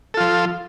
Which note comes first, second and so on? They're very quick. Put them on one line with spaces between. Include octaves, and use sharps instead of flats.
A4 F4 F3